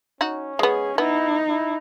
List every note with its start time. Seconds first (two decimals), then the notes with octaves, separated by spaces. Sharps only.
0.21 C#4 D#4 F#4
0.59 G#3 B3 G#4
0.98 B3 D#4 E4
1.49 E4